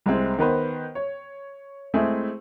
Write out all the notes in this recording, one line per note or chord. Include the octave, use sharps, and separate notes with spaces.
C2 G#3 C4 E4
D#3 B3 B4 C5
C#5
G#3 A3 C4 E4 G#4